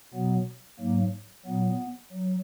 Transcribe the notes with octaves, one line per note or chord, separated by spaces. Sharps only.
B2 F#3 B3
G#2 F#3 A#3
A#2 F#3 B3
F#3